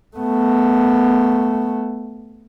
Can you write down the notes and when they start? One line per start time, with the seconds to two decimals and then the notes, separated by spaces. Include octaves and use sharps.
0.17 A3 B3